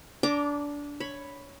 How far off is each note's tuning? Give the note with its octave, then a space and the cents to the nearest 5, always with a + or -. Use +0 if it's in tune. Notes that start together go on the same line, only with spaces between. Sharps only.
D4 -20 A#5 +0 D6 +0
C#5 +0 B5 +0